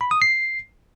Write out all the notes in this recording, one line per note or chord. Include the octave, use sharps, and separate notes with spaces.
B5
D#6
C7